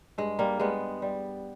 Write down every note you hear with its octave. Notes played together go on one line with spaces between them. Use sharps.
G2 G#3
G3 A#3
G3 G#3 B3
G3